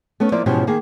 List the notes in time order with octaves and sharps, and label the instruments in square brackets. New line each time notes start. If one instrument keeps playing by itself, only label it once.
[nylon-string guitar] A3 B3 C#4
F3 A#3 E4 D5
G#2 B2 E3 F3 C#4 G4
D#3 A#3 G#4